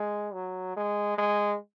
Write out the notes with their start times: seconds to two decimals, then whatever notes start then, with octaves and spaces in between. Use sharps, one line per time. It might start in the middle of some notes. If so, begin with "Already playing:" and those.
Already playing: G#3
0.33 F#3
0.76 G#3
1.18 G#3